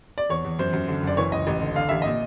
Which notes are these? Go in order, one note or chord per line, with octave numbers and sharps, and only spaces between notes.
D5
E2 C#5
E2
F#2 C5
F#2
D3
F#1 D5
E3 C#5
C#2 D#5
A1
D3
D3 F5
A1 E5
A#2 D#5